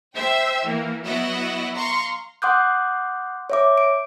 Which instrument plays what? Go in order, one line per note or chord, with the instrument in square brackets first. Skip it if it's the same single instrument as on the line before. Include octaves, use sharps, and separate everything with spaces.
[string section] C5 E5 G5 E6
E3 A#3
F#3 B3 E4 F#4 D#5 E5
F5 A#5 C6 C#6
[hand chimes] F#5 C6 D6 D#6 F#6 G6
C#5 E5 D6
D7